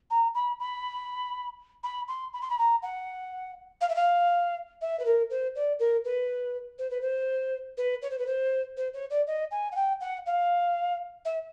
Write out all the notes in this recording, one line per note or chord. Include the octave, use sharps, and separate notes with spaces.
A#5
B5
B5
B5
C6
B5
C6
B5
A#5
F#5
F5
E5
F5
E5
B4
A#4
C5
D5
A#4
B4
C5
B4
C5
B4
C#5
C5
B4
C5
C5
C#5
D5
D#5
G#5
F#5
G5
F#5
F5
E5